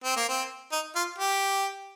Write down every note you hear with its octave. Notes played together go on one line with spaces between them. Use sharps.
C4
A#3
C4
D#4
F4
G4